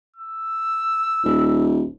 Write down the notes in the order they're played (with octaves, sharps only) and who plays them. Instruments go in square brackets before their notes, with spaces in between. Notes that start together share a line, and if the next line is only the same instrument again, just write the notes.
[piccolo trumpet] E6
[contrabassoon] D#1